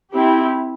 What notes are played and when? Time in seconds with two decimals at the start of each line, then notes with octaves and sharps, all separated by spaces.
0.13 C4 E4 G4